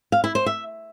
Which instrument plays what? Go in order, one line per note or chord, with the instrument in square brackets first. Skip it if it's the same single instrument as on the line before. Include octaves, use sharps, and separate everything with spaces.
[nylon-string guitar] F5
E4
C5
E5